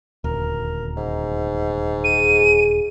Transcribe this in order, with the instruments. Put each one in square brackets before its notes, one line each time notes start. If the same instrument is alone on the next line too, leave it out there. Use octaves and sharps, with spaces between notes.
[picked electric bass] D#1 D2 [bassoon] A#4
[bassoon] G#2
[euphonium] G#4 [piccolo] D#7